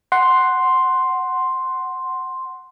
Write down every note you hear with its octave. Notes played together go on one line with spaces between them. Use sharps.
F#5 C6